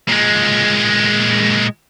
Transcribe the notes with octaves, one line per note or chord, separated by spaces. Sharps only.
A#2 G#3